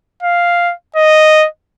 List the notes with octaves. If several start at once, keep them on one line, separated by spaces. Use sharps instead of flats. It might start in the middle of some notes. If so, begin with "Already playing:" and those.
F5
D#5